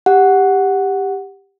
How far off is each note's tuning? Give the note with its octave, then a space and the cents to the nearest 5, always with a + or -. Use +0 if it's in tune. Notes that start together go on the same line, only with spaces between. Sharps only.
G4 +10 F#5 +0